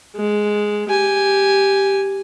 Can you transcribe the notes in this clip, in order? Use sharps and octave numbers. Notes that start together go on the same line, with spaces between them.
G#3
G4 G#5